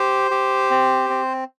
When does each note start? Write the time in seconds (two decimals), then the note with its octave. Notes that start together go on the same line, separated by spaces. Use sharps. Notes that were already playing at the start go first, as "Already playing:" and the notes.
Already playing: G4 C5
0.31 G4
0.71 C4
1.10 C4